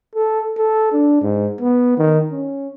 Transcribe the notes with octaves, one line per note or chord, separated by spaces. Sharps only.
A4
A4
D4
G#2
B3
D#3
C#4